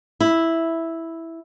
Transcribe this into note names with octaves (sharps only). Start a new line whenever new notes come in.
E4